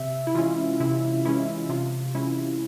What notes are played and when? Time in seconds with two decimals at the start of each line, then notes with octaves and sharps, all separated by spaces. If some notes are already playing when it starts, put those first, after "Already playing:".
Already playing: C3 E5
0.27 E4
0.35 E3 G#3 C#4 F4
0.80 C3 E4
1.25 E3 G#3 C#4 E4
1.69 C3 F4
2.15 E3 G#3 C#4 E4